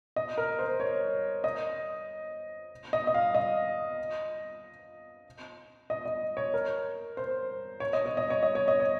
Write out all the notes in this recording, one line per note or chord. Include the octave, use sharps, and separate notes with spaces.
D#5
A#4
C5
C#5
D#5
D#5
D#5
F5
D#5
D#5
D#5
C#5
A#4
C5
C#5
D#5
C#5
D#5
C#5
D#5
C#5
D#5
C#5